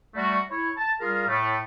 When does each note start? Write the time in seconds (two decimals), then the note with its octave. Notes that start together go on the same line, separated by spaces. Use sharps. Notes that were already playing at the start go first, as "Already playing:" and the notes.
0.15 G3 A3 F#4
0.51 E4 C#5
0.77 A5
1.01 G3 F4 G#4 A#4 F5
1.28 A2 A3